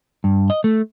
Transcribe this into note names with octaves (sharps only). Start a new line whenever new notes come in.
G2
D#5
A3